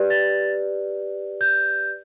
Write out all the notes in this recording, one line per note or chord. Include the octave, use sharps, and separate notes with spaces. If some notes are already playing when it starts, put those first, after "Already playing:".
Already playing: G4 B4 D5
A6
G6